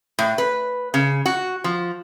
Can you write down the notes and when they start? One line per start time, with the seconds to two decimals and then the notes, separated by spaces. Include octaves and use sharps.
0.19 A2
0.38 B4
0.94 C#3
1.26 F#4
1.64 F3